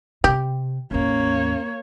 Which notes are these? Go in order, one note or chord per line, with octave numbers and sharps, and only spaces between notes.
C3 G4
A1 E2 A#3 C#4 C#5